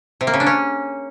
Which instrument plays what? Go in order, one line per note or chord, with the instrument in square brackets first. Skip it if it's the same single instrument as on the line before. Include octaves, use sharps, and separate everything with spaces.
[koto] C3
A#3
C#3
D4
C#4